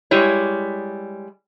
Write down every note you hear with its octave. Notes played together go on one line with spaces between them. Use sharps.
G3 G#3 E4 C#5